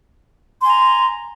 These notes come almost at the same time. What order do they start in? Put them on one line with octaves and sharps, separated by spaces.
C6 G#5 A#5